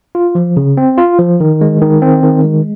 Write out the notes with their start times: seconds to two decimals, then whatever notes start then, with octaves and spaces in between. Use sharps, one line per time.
0.15 F4
0.35 F3
0.57 C#3
0.77 C4
0.98 F4
1.19 F3
1.40 D#3
1.61 G#3
1.81 D#3
2.02 C4
2.23 D#3
2.44 G#3